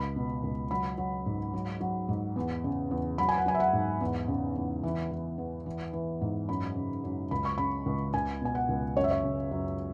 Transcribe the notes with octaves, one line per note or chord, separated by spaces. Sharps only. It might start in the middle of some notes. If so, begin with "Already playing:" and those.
Already playing: C#2 B5
B2
C#2
F#3 B5
F#3
G#2
F#3
F#3
G#2
E2
C#3
E2
F#3 B5
G#5
F#5
F#3 G#5
E5
F#5
G#2
E2
C#3
E2
E3
E3
E2
E3
E3
G#2
F#2 B5
C#3
F#2
C#2 B5
C#6
C#3 B5
C#2
C#2 G#5
B2 G#5
F#5
C#2
F#2 C#5
E5
C#5
C#3
F#2